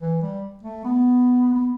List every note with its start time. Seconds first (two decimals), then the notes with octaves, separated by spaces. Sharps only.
0.02 E3
0.22 G3
0.63 A3
0.84 B3
1.54 B3